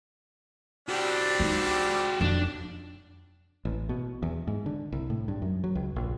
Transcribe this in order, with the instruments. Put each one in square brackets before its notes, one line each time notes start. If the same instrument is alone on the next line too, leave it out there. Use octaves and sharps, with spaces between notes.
[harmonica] G3 C4 D4 [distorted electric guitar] F#4 G4
[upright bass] G#3 D#4
[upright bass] F2 [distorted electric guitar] D4
[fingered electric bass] A1
B2
E2
G#2
D3
C2
A2
G2
F#2
F#3
C#2
A#1